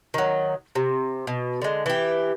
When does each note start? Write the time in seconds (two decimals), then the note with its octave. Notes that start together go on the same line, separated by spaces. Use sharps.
0.14 D#3 F#3
0.75 C3
1.27 B2
1.62 D3 G#3
1.86 E3 G4